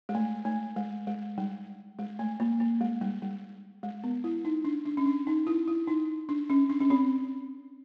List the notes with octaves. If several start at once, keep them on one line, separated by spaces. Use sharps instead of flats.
G#3
A3
A3
G#3
G#3
G3
G#3
A3
A#3
A#3
G#3
G3
G3
G#3
B3
E4
D#4
D4
D4
C#4
D4
D#4
E4
E4
D#4
D4
C#4
D4
C#4
C4